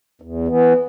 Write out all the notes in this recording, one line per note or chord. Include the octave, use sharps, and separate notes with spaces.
E2
E3 B3